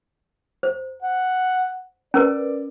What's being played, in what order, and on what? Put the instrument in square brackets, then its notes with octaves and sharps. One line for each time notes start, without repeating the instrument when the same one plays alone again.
[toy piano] C5
[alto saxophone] F#5
[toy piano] C#4 A#4 B4 [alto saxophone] D5